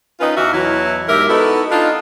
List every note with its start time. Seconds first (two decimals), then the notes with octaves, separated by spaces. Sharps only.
0.20 C#4 D#4 F4 B4
0.37 E2 E3 F#4 E5 F5
0.53 E2 B2 F#3 E4
1.09 G#2 G4 A#4 E5
1.29 B3 D#4 E4 F#4 A4
1.72 D4 D#4 F4